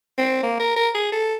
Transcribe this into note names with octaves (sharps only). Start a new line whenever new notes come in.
C4
A#3
A#4
A#4
G#4
A4